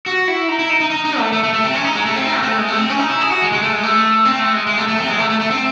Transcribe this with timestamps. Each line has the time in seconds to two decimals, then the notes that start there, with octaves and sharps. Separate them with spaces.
0.06 F#4
0.28 E4
0.49 D#4
0.59 E4
0.70 D#4
0.80 D#4
0.90 D#4
1.05 D#4
1.18 A3
1.33 A3
1.43 A3
1.53 A3
1.64 C4
1.74 C#4
1.85 D#4
1.95 G#3
2.06 A3
2.16 C4
2.27 D#4
2.37 A3
2.43 C4
2.48 A3
2.58 G#3
2.68 A3
2.78 C4
2.89 C#4
2.99 D#4
3.10 E4
3.21 G#4
3.31 F#4
3.42 G#3
3.52 G#3
3.62 A3
3.73 G#3
3.83 A3
4.25 C4
4.39 A3
4.53 G#3
4.67 G#3
4.77 A3
4.88 A3
4.98 C4
5.08 G#3
5.19 A3
5.30 A3
5.40 A3
5.51 C4